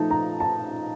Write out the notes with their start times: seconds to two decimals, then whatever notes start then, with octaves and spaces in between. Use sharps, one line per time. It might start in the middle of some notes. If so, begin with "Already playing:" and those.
Already playing: F3 A3 D#4 A5
0.11 A#5
0.40 A5